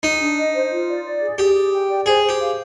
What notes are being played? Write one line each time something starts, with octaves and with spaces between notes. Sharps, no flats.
D#4 G#4
D4
D#5
C5
F4
D5
D5
G#4
G4 G#4
G#4
G5
D5
G#4 C5
C5
G4
F5